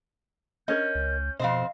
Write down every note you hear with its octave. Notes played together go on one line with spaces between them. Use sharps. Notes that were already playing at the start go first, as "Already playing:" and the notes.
C#4 A#4 C#5 D#5 G6
C#2
F2 B2 C4 C5 D#5 F5